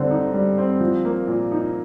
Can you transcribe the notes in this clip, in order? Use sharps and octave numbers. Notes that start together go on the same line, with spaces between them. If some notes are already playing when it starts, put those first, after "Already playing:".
Already playing: D3 G3 C4
D#4
G3
C4
F3
A#3
A#2
D#4